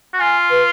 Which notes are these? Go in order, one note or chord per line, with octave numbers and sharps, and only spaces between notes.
F#4
F4 G#5
B4